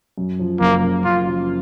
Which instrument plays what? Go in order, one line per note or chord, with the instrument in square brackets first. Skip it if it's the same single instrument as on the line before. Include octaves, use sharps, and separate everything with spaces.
[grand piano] F#2
F3
[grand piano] F#1 [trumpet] A#3
[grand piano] C#3
[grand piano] F#2 [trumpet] F4
[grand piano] F3